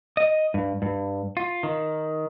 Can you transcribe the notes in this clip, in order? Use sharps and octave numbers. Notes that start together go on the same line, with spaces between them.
D#5
G2
G2
F4
D#3